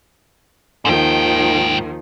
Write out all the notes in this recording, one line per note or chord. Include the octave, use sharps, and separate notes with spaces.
D#2 G#2 D#3 F3 G5